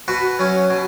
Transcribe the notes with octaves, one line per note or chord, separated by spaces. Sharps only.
B2 F#4 B4
F#3 C#4
B2